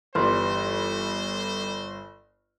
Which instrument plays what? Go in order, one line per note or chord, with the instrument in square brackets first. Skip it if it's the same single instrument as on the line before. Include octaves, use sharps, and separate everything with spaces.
[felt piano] G1 [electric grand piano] E3 G3 [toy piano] B4 C6 [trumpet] C5